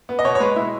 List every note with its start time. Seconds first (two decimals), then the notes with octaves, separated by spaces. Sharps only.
0.09 B3
0.19 D#5
0.25 B2 C#5
0.35 C#5
0.40 G#3 B4
0.56 G#3 E4